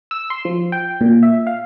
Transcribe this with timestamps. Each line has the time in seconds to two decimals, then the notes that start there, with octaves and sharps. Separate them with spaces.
0.11 E6
0.30 C6
0.45 F3
0.72 G5
1.01 A#2
1.23 E5
1.47 F5